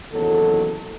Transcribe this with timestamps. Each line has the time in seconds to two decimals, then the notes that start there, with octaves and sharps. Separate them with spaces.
0.12 F#1 E2 D#3 F#3 A4